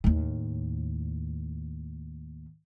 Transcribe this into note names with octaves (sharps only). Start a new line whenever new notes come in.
D#2 A2